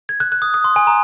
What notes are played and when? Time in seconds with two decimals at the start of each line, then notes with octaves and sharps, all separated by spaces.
0.09 G#6
0.20 F#6
0.32 F#6
0.42 D#6
0.54 D#6
0.64 C6
0.76 G#5
0.87 A#5